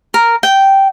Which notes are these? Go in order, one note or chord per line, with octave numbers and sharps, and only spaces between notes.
A#4
G5